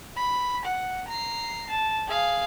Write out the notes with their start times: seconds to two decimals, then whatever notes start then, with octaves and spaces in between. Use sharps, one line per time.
0.17 B5
0.65 F#5
1.08 A#5 C7
1.71 A5
2.08 G#4 F5